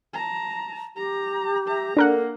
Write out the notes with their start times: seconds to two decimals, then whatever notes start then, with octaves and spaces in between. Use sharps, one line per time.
0.14 A5 A#5
0.96 G4 A#5
1.67 E5 A#5
1.97 A#3 D4 A4 A#4 F#5